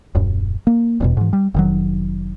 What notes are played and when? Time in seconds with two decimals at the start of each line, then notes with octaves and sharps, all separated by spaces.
0.15 D#1 F#2
0.67 A#3
1.00 D#1 E2 B2
1.17 G#2 E3
1.33 G3
1.54 F1 D#3 F#3